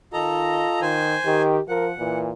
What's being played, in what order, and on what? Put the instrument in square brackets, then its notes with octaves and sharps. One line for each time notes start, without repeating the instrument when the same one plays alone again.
[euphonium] D#3 [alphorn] F4 [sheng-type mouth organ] A4 D#5 A#5
[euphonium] D#3 [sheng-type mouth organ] C5 G#5
[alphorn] D#3 [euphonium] G4
[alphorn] F3 [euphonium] A#4 [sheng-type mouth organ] F#5
[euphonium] A#2 [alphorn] E3